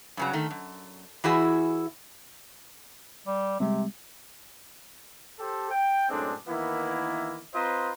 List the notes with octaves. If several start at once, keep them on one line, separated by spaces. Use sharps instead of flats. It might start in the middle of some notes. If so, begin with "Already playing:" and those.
G2 C#3 F#3
D#3 A3
F#2
E3 E4 F#4 G#4 E5
G3
C3 G3 G#3 C4
G4 A4 C5
G5
F#2 A2 G#3 C4 D4
D#3 E3 A#3 B3 E4
C4 F4 B4 C5 D#5 A#5